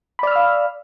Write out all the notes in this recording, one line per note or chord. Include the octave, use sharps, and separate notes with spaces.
D5 F5 B5 E6 F6